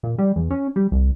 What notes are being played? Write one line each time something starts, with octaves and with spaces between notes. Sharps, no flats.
A#2
G3
E2
C#4
G3
C2